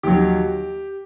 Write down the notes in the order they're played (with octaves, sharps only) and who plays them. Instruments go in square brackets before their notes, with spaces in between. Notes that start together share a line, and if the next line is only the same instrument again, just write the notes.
[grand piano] D#2 D#3 F#3 G4